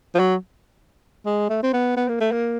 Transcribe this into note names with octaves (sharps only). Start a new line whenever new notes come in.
F3
F#3
G#3
A3
C4
B3
B3
A#3
A3
A#3